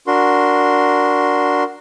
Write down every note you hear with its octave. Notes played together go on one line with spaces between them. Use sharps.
D4 F#4 A#4 C6